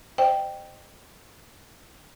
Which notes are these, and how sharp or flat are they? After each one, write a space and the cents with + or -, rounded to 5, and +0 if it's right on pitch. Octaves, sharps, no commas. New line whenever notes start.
C5 +0 D#5 -25 G5 +0